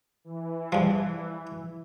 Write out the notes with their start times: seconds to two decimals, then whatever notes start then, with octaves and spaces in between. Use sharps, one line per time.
0.24 E3
0.72 G2 F3